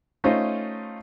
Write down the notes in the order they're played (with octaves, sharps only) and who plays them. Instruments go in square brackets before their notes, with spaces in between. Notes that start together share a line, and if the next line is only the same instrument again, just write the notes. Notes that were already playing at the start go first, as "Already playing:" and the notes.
[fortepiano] A3 C#4 D#4 F4 C5 D#5